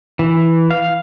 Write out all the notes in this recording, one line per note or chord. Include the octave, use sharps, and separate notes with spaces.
E3
F5